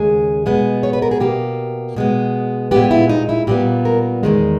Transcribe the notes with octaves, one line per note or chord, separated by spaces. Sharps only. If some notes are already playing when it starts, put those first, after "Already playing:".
Already playing: D#2 C#3 G#3 G#4
B2 G#3 B3
C#5
B4
A#4
G#4
B2 A#3 G4
B2 G#3 B3
A#2 G#3 B3 G4
E4
D#4
E4
A#2 G3 B3 G4
A#4
E2 D#3 G#3